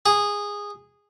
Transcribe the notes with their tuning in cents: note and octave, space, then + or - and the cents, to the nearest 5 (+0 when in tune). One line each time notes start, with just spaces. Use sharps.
G#4 -15